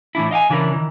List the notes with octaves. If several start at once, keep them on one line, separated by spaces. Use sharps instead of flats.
A2 E3 D4 E4
D#5 F5 G5 G#5
C#3 E3 D4 E4 A#4
D#3 E3